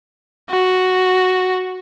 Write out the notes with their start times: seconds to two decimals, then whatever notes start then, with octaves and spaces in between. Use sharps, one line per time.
0.51 F#4